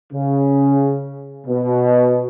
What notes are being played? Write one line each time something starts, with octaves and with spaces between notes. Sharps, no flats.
C#3
B2